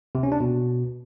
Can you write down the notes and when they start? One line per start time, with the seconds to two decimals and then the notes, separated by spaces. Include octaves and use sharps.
0.15 C3
0.23 C#4
0.32 D4
0.40 B2